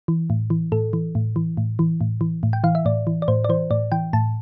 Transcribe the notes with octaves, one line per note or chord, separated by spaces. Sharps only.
E3
A2
E3
A2 A4
E3
A2
E3
A2
E3
A2
E3
A2
G5
E3 F5
E5
A2 D5
E3
D5
A2 C5
D5
E3 C5
A2 D5
E3 G5
A2 A5